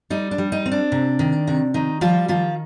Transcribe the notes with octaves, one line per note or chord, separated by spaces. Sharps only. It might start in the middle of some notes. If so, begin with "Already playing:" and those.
G3 D#4
D4
G3
D#4
C4
D4
C3
D#3
C3
D#3 D#4
F3 G3 F4
D#3 F3 F4